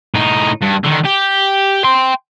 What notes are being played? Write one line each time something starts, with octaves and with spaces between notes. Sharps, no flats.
A2 D#4
G2
D3 D#3
G4
G5 C6